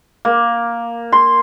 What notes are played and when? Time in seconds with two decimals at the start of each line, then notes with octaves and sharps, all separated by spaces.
0.25 A#3
1.12 C6